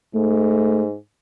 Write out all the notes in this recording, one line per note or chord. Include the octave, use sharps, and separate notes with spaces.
G#2 A3